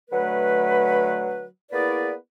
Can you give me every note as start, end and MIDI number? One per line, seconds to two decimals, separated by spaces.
0.10 1.47 50
0.10 1.47 54
0.10 1.47 57
0.10 1.47 71
1.72 2.14 58
1.72 2.14 59
1.72 2.14 64
1.72 2.14 68
1.72 2.14 71
1.72 2.14 74